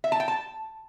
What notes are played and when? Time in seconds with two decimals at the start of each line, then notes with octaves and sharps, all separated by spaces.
0.04 E5
0.12 A5
0.20 G5
0.28 A5